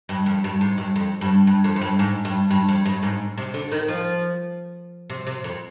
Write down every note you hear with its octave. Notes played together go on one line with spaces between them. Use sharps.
G2
F2
G2
G#2
G2
F2
G2
G2
F2
F2
G2
G#2
G2
G2
F2
G2
G#2
C3
D3
D#3
F3
C3
C3
F2